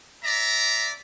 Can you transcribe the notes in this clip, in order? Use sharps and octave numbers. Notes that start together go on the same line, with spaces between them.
D5 E5 A#5